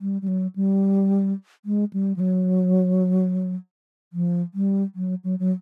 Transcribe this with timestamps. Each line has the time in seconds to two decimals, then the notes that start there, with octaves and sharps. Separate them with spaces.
0.01 G3
0.22 G3
0.28 F#3
0.56 G3
1.65 G#3
1.93 G3
2.16 F3
2.20 F#3
4.13 F3
4.54 G3
4.95 F#3
5.24 F#3
5.39 F#3